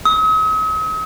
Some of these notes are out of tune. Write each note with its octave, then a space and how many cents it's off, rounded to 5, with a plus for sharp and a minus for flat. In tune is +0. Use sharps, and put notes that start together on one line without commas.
D#6 +45